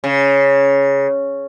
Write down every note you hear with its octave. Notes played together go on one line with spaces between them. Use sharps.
C#3